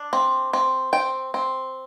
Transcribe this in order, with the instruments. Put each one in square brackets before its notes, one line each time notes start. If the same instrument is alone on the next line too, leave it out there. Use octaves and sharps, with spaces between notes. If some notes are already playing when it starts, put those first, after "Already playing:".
Already playing: [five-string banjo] D4
C4
C4
C4 G5
C4